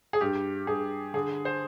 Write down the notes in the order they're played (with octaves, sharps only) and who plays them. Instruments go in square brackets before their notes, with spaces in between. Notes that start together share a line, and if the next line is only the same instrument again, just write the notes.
[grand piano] G#4
G2 G4
G2 G#4
D3 G#4
C5